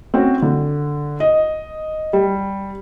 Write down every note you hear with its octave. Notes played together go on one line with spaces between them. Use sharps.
C4 C#4 F#4
D3
D#5
G3